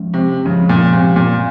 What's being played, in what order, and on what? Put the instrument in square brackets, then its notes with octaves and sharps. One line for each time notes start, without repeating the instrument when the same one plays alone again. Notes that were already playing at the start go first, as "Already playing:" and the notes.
Already playing: [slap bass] F3 G#3 C#4
[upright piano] C3
[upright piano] C#3 [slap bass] F3 G#3 C#4
[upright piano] A#2
C3
A#2